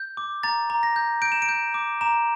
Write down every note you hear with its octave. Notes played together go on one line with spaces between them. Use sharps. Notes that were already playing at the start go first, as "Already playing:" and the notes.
Already playing: G6
D6
A#5 A6
A#5
A#6
G6
G6 D7
E7
D7
G6
D6
A#5 E7